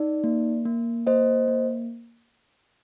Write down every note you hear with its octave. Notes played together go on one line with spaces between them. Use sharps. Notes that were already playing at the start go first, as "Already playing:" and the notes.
Already playing: D#4 D5
A#3
A#3
A#3 C5 D#5
A#3